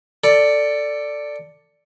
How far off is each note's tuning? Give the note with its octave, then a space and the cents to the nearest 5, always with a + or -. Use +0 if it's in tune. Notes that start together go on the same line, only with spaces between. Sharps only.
A4 +15 D5 +0